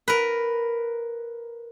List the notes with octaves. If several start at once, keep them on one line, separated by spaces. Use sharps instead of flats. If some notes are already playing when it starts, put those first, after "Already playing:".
A#4 B4